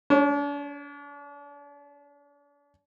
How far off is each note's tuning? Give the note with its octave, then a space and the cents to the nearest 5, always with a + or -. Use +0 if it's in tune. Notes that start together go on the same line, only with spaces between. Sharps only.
D4 -40 C#5 +0